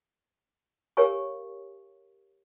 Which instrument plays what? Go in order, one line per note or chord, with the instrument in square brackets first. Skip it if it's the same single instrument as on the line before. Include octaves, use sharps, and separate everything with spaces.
[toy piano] G4 A#4 C#5 F5 G#5 C#6